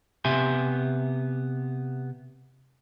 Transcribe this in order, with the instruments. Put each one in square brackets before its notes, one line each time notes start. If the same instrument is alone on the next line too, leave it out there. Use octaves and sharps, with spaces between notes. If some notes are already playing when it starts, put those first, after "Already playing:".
[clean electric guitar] C3 B3 G4 E5 G#5 C6